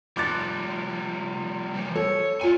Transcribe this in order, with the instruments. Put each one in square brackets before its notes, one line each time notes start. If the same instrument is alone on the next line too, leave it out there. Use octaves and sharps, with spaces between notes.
[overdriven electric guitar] F3 G3 [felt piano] D6 F#6 A6
[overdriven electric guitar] E3 G3
[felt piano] A4 [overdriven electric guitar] C#5
[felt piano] F4 D#7 [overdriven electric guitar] D5 G#5